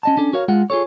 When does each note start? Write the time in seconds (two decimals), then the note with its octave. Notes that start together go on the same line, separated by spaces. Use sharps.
0.03 C#4 D#5 A5
0.17 C#4 D4 A4
0.33 F#4 A#4 C#5 F5
0.48 G#3 F4 F#5
0.70 F4 G#4 A4 C#5